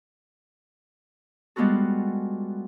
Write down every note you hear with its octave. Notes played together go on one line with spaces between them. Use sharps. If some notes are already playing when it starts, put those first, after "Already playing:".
G3 G#3 B3 F4 F#4 A4